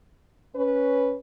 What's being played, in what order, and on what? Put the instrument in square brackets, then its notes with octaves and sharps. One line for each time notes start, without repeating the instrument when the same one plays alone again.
[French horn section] C#4 B4